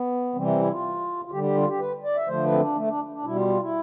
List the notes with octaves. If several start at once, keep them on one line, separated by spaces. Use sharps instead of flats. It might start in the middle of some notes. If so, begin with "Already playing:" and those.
Already playing: B3
C3 E3 G3 C4
C4
E4
F4
F4
D3 G3 G4
G4
F4
G4
B4
D5
E5
D3 F3 A3 C5
B4
C4
D4
A3
D4
D4
B2 G3 E4
F4
F4
E4